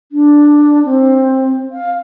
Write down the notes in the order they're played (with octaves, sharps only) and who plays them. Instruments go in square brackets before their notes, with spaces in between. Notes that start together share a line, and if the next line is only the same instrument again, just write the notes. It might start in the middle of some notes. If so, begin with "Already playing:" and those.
[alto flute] D4
C4
F5